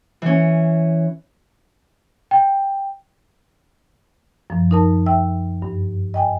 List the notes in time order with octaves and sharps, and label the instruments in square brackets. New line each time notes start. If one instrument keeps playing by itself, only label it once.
[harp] E3 C#4
[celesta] G5
[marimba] F#2 F3
D#4 A#4 A5
E5 G5 E6
G2
D#5 G5 G#5